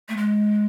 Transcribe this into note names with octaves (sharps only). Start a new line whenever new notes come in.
A3
G#3